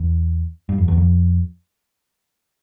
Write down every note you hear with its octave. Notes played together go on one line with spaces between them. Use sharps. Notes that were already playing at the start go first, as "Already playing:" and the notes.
Already playing: E2
G2
F2
E2
F2